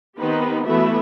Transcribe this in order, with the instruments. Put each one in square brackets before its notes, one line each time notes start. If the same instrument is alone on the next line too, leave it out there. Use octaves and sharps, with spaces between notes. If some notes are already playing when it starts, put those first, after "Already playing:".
[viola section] D#3 B3 C4 D#4 G4 B4
E3 A3 B3 F#4 B4 E5